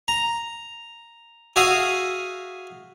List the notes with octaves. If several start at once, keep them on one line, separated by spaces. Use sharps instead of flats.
A#5
F#4 G#4 E5 F5 D#6